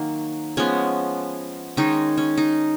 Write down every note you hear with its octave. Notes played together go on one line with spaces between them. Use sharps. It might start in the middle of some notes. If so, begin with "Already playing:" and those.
Already playing: D#3 F#3 A#3
F3 G#3 B3 C#4
D#3 G#3 C#4 D#4
C#4
D#4